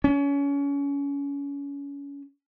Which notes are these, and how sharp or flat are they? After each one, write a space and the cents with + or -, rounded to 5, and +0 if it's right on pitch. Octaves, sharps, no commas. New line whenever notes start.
C#4 +30